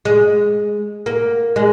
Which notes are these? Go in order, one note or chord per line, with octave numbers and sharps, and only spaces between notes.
G#3
A#3
G#3